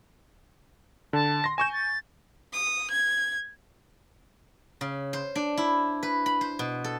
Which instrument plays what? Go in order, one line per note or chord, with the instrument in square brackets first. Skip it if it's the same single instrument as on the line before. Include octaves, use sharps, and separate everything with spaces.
[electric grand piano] D3 [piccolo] A5
[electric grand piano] C6 A#6
[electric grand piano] G#5 C#6 G6 [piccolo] E7
[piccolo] A6
[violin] D#6
G#6
[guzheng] C#3
C5
D4
E4
B4
B5
C5
B2
A4